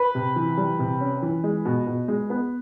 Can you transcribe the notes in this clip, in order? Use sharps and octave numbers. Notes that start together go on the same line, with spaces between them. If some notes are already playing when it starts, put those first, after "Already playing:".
Already playing: B4
C3
E3
G3
C3
C#4
E3
G#3
B2
B2
G#3
B3